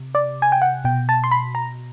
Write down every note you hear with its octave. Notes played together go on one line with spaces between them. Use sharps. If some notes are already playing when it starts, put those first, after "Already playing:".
Already playing: C3
D5
G#5
G5
F#5
B2 G5
A5
C6
B5
A#5